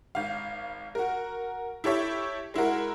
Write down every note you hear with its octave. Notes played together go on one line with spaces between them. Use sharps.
G#1 F5
F#4 A#4
E4 G4 A4 C#5 E5
G#3 E4 F#4 A#4